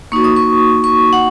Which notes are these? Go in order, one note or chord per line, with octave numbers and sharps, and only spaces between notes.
A#3 D#4 F#4 C#6
D#6
C#6
C#6
F#5